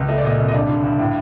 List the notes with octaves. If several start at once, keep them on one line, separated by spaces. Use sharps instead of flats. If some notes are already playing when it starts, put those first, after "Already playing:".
Already playing: C#2
A3 D#5
D5
A#2 D#5
C2
D#5
G2 D5
D3
G2
A2